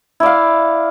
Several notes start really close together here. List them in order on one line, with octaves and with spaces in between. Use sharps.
E4 D5 F5